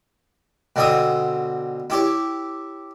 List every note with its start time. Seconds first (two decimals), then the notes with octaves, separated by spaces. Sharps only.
0.76 B2 D3 C4 E5 D#6
1.90 E4 G4 C#5